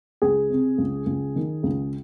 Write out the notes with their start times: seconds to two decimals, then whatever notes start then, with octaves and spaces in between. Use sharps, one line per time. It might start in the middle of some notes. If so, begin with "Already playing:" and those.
0.22 C#2 G#4
0.50 C3
0.78 C#2
1.06 C#2
1.36 D#3
1.63 C#2